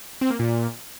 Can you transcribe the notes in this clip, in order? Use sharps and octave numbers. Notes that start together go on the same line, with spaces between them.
C4
A#3
A#2